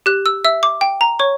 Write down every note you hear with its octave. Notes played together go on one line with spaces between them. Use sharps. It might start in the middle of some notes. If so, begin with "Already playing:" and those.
G4 F#6
E6
E5 E6
D6
G5
A#5
C#5 C#6